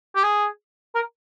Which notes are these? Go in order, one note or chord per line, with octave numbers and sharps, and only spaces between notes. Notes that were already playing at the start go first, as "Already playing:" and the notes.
G4
G#4
A#4